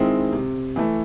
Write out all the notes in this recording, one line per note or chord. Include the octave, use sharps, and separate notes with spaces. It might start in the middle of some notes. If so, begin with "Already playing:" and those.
Already playing: D#3 G#3 C4 E4
C3
E3 A3